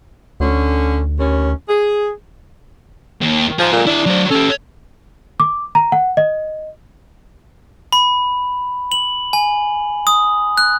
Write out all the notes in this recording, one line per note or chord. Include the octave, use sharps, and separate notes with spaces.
D2 D3 C#4
D#2 C#4
G#4
D#2
F3 G#4 C5
A#2 G#3 A#3
D4 E4 D5
F#3 C5
C#4 G4 A4
D6
A#5
F#5
D#5
B5
F#7
G#5
D#6
F#6